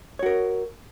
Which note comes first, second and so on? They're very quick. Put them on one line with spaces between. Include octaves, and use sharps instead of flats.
C#5 F#4 A#4